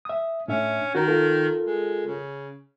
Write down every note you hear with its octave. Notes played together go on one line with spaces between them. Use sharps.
E5 D#6
A2 C#4 D4 E5
D#3 F#4 A#4 A#5
F4 A4 A#4
G#3
C#3